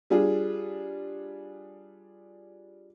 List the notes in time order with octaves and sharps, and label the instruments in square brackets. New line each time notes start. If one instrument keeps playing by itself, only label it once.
[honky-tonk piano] G3 D4 F4 G#4